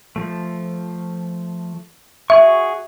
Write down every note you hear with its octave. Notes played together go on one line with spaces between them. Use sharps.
F3 A3
F#4 G#4 E5 C#6